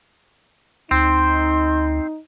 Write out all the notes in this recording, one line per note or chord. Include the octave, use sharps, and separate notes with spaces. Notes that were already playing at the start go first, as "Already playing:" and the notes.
D2 C4 D#4 C6